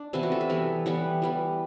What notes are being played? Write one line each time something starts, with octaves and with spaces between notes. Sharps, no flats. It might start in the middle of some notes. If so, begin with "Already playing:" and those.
Already playing: D4
C3 E3 B3 E4
F#4
A4
E5
E3 G3 B3
E3 G3 B3 F#5
E3 G3 B3